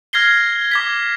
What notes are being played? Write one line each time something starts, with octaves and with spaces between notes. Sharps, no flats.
F6 G#6 A#6 C7 G7
D6 G#6 B6